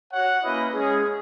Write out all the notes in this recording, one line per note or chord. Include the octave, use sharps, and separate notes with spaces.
F#4 C#5 F#5
A#3 C#4 E4 B4 D#5
G#3 C#4 G#4